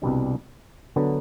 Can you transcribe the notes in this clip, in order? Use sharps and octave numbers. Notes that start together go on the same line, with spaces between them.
C2 B2 G3 D4
D3 F#3 B3